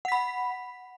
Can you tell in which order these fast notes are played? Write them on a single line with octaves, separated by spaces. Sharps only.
F#5 B6 B5